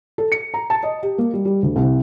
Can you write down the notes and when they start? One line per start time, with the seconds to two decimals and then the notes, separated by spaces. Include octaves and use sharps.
0.18 A4
0.32 C#7
0.54 A#5
0.70 A5
0.83 D#5
1.03 G4
1.18 A#3
1.33 G3
1.45 G3
1.63 D2
1.76 C2